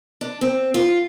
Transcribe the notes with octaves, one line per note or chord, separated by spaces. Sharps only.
D4
C4
F4